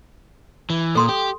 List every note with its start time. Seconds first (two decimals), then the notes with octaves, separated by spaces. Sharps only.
0.70 E3
0.95 A#2 A4 C6 D#6
1.09 G4